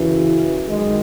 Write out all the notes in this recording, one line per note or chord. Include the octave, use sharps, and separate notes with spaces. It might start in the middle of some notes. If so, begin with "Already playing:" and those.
Already playing: F#2 C#3 E3
F#2 D#3 G#3